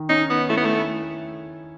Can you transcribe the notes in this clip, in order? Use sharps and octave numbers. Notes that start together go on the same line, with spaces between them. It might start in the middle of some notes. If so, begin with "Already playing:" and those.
Already playing: D#3
C#4 D#4
B3
A3 E4
B3
A3